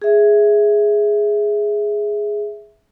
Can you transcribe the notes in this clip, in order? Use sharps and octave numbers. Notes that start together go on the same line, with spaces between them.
G#4 E5